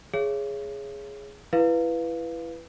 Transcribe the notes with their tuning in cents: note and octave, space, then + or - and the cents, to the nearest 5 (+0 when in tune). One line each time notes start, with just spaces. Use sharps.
G#4 +0 C#5 +0 E5 +45
E4 +25 B4 +0 F5 +0